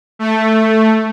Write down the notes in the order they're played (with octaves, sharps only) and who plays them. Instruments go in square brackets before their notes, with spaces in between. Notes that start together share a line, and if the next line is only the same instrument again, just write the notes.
[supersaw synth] A3